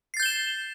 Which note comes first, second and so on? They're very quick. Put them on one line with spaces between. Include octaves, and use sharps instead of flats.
C7 A6 G6 G7 E7